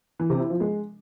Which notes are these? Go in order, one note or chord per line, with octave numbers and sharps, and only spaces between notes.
E3
C3
E4
F3
G#3